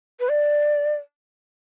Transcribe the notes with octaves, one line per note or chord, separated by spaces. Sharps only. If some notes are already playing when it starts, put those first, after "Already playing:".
B4
D5